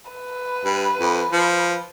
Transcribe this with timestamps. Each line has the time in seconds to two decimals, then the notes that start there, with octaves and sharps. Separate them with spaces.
0.11 B4
0.65 G2
1.00 F2
1.32 F3